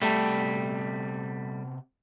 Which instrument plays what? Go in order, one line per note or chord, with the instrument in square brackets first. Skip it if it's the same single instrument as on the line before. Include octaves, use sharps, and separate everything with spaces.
[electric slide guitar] C3 B3 A5 [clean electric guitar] G3 A3